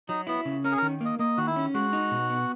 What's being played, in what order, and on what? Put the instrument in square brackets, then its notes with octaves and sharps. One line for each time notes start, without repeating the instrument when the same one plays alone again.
[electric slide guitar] F#3 [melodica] D#4
[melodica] B3 [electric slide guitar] E4
[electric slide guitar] C#3
[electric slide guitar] C#4 [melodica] A#4
[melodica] G#4
A#4
[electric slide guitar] D#3
[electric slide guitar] A#3 [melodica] D#5
[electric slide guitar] A#3 [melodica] D#5
[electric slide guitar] D#3 [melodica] F#4
[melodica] E4
[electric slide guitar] C#4
[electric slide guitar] G#3 [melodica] F#4
[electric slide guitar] D#4
B2
B3